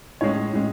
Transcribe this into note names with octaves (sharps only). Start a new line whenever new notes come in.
A2 G#3 C#4 C#5
A2 G#3 C#4